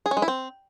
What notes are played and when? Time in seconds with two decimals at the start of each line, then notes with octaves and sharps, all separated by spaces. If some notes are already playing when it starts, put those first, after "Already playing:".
0.06 G#4
0.11 C#4
0.17 G#3
0.22 E4
0.28 C4